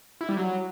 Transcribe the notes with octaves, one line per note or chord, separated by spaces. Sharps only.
E4
G3
F#3